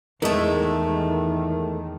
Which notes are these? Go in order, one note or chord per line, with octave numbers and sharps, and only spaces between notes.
E2 A2 D#3 E3 G#3 A3 A#4 D#5